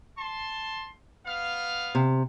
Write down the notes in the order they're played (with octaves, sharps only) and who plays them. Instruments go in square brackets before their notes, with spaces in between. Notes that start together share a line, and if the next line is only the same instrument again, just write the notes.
[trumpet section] A5 C6
B3 F5
[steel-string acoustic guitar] C3